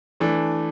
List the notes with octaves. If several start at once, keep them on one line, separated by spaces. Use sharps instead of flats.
E3 A3 D4